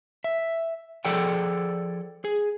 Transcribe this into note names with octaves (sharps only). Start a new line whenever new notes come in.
E5
F3 G#4 A4 D5 F#5 G5
G#4